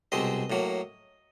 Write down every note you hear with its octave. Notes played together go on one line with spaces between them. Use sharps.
C2 B2 G#3 C4 D#5
A2 F#3 A#3